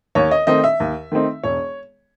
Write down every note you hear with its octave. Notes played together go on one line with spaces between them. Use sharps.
D#2 C#5
D#5
D#3 A3 C4 D#4 D#5
E5
D#2
D#3 A3 C4 D#4
E1 C#5